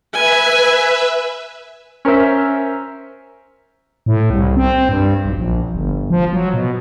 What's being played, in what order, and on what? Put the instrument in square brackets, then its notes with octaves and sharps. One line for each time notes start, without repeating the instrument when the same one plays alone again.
[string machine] B4 E5 [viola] G#5
[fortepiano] C#4 A#4 C5 E5
[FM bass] A2
C2
C4
G2
B1
A#1
G1
F3
F#3
B2